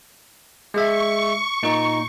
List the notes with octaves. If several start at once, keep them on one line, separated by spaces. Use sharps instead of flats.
G#3 E5 C#6
A#2 D#4